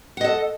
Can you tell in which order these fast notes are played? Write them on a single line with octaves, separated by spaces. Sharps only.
F#5 D#5 A4